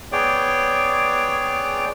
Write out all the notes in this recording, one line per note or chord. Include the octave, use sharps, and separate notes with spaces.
B3 G#4 C#5 D5 G5